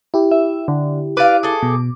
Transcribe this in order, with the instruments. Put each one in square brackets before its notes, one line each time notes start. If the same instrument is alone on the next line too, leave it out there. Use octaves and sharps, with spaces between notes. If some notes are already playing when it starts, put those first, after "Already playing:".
[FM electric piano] E4 G4
[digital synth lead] E5
D3
[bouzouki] B4 D5 F5 [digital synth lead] D6
[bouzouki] G#4 A4
[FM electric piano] B2